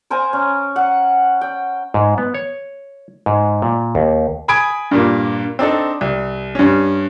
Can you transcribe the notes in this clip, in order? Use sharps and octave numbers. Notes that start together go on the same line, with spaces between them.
A#4 C5 G#5 A#5
C#4
F#5
G5
G#2
B3
C#5
G#2
A#2
D#2
G#5 B5 D#6 G#6 D7
G2 A#2 A#3
C4 D4 D#4 A4
C2
G2 C#4